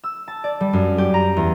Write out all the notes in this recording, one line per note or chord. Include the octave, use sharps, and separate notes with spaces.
E6
A5
D5
G3
F#2
G4
A#5
E2